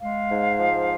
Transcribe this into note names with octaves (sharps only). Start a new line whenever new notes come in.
G#3 F5
G#2
F3